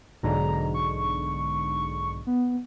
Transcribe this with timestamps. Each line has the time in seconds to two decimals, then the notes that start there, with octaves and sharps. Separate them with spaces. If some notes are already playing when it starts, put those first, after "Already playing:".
0.23 B1 G#2 D3 A#5
0.74 C#6
2.27 B3